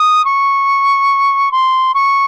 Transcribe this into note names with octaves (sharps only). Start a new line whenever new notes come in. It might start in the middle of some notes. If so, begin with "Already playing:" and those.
Already playing: D#6
C#6
C6
C#6